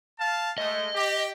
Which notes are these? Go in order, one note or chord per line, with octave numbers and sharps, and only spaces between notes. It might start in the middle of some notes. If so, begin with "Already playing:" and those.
F5 A5
G#3 A3 D#5
G4